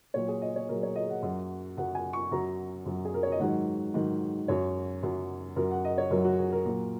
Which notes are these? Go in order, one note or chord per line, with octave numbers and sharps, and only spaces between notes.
A#2 F#3 C#5
G#4
D#5
C#5
A#2 F#3 A#4
C#5
D#5
F#5
F#2 F#3
F#2 F#3 F#5
G#5
C#6
F#2 F#3 A#5
F#2 F#3
G#4
A#4
C#5
D#5
G#2 D#3 F#3 F#5
G#2 D#3 F#3
F#2 F#3 C#5
F#2 F#3
F#2 F#3 A#4
F#5
D#5
C#5
F#2 F#3 A#4
F#4
G#4
A#4
A#2 F#3